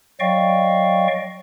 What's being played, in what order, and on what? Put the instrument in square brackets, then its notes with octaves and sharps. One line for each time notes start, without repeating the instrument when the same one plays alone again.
[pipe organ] F#3 D5 D#5 F5 G5 C#6